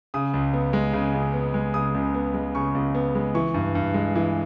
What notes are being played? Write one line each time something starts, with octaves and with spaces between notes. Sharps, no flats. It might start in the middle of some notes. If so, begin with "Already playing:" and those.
C#3 D#6
C#2
B3
G#3
C#3
C#2
B3
G#3
C#3 D#6
C#2
B3
G#3
C#3 C#6
C#2
B3
G#3
E3 C#6
G2
G2
G#3
E3